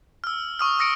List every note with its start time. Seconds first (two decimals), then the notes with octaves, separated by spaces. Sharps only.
0.24 E6 F6
0.59 C#6 D#6 F6
0.79 D#6 E6 A#6 C#7 D7